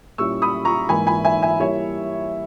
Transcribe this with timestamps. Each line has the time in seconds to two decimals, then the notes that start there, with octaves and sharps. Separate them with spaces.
0.18 A#2 G3 C#4 E4 C#6 E6
0.42 B5 D#6
0.65 A#5 C#6
0.89 G#2 E3 A#3 E4 G#5 B5
1.07 G#5 B5
1.25 E5 G#5
1.42 E5 G#5
1.60 G3 A#3 E4 C#5 E5